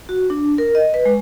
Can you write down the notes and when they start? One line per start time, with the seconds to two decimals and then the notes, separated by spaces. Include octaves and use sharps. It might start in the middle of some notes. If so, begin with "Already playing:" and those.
0.09 F#4
0.30 D4
0.58 A#4
0.75 D#5
0.94 B4
1.05 G#3